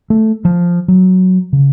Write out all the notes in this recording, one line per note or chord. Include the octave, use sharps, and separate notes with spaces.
A3
F3
F#3
C#3